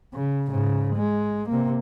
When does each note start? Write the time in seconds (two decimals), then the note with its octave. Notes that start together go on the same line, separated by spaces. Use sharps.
0.14 C#3
0.48 G#2 C#3
0.95 G#3
1.49 C3 A#3